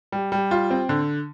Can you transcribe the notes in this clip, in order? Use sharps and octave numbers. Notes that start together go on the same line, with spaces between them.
G3
G3
F4
C4
D3